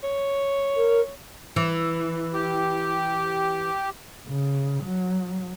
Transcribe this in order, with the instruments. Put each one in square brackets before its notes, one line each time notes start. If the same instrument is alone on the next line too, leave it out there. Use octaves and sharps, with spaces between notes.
[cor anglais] C#5
[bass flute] A#4
[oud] E3
[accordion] G4
[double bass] C#3
F#3